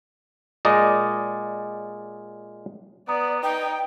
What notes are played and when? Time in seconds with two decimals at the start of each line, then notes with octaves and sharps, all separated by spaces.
0.65 A#2 G#3 D5 D#5 A#5
3.08 B3 D5 A#5 D#6
3.43 D#4 B4 G5